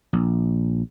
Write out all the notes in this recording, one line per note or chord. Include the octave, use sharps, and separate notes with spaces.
A#1